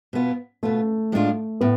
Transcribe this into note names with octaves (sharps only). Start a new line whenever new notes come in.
B2 B3 F4
B2 A3 B3 F4
A2 G#3 D4 F4
A2 B3